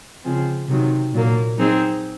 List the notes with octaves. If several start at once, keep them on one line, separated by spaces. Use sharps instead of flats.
C#3 F3 G#3 C4
C3 D#3 F#3
A#2 F#3 A#3
F#3 C4 D#4 G#4